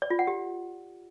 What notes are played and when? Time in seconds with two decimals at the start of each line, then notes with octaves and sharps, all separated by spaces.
0.02 D5
0.10 F4
0.19 F#5
0.27 G4